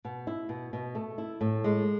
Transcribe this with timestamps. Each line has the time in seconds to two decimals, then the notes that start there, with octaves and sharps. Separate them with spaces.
0.05 B2
0.27 E4
0.49 B2
0.73 B2
0.95 A3
1.18 E4
1.41 A2
1.64 G#3